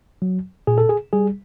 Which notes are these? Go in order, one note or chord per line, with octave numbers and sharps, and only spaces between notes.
F#3
A#2 G#4
A4
G#4
G3 G#4